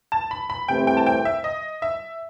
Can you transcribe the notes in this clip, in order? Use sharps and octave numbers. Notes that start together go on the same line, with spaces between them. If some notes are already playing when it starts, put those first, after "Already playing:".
A5
B5
B5
C2 C3 E3 A3 C4 G5
G5
A5
G5
E5
D#5
E5